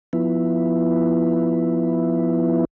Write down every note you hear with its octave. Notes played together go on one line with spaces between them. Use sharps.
F3 B3 E4